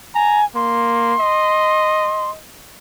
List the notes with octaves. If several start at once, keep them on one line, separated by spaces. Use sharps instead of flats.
G#5 A#5
A#3 C6
D#5